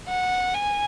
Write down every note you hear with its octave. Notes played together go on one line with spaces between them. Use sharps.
F#5
G#5